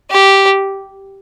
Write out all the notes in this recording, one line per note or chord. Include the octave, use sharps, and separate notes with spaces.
G4